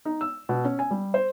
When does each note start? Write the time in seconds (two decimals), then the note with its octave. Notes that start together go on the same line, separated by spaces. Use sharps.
0.05 D#4
0.21 E6
0.49 B2
0.65 C#4
0.79 G#5
0.91 G3
1.14 C5